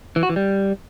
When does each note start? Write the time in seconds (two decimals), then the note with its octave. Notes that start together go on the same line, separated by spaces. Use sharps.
0.16 E3
0.23 F#4
0.29 E3
0.36 G3